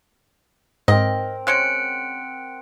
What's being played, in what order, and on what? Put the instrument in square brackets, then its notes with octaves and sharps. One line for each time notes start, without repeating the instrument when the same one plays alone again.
[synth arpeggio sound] G#2 [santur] C4 A#4 [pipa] D#5
[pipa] G#3 C4 C#4 [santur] F#5 [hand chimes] F#6 C#7 D7